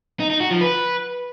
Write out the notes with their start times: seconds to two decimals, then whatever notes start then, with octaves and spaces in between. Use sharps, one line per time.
0.20 D#4
0.30 D#4
0.40 F#4
0.51 F3
0.61 B4